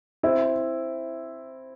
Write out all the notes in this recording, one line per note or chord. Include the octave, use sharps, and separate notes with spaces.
C4 E4